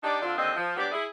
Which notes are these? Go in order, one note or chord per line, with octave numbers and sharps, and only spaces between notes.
D4 D#4 G4 D5
D3 C4 D4 F4
D#2 D3 C4 D#5
F3
F#3 B3 D4 G4 D5
E4 G#4